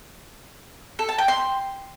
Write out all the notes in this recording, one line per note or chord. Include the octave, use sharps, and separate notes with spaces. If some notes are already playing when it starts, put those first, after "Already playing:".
A4
A5
G5
C6